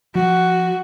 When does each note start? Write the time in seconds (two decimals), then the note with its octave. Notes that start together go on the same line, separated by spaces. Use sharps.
0.15 F3 F#4